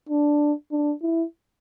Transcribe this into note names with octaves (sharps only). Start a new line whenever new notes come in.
D4
D4
E4